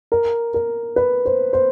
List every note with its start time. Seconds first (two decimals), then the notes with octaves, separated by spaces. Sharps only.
0.12 A#4
0.54 A#4
0.96 B4
1.26 C5
1.53 C5